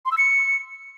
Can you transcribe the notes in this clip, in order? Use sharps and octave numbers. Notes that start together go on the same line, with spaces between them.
C6
E6
C#7